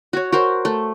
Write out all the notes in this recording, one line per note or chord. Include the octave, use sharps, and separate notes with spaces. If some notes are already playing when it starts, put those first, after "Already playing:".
F#4 C#5
F#4 A#4 C5
A3